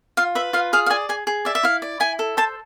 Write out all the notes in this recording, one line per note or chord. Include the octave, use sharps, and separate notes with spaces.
F4 F5
B4 E5
F4 F5
G#4 F5
F5
D5 G#5
G#4 G#5
G#4
D5 E5
E5
E4 F5
D5
E4 G#5
A4
C5 A5